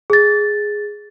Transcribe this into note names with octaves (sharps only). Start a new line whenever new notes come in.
G#4 A6